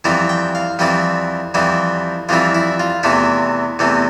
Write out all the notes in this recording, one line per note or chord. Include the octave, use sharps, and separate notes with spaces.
F2 E3 G3 C4 E4 A#5
G5
F5
F2 E3 G3 C4 E4 G4
F2 E3 G3 C4 E4
F2 E3 G3 C4 E4 F4
E4
F4
E2 C3 E3 A3 C4 E4
E2 C3 E3 A3 C4